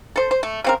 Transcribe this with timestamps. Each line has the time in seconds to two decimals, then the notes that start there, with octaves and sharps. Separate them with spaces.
0.16 A4 C5
0.31 C5
0.43 A3
0.64 C#3 C4 A#4